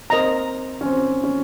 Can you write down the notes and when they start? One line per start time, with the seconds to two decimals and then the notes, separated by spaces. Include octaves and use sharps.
0.10 C4 A#4 D#5 A#5
0.81 C#4
0.85 C4
1.24 C#4